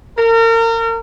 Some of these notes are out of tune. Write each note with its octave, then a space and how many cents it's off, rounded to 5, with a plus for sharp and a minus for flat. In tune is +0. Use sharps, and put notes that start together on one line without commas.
A#4 -35